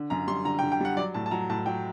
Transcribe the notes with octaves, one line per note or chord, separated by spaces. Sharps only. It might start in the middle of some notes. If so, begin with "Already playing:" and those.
Already playing: D3
F#2 A#5
G3 C6
D3 A#5
G5
D3
G5
G3 F#5
F#3 D5
A2 A5
A5
F#3 A#5
A2 A5
F#3 G5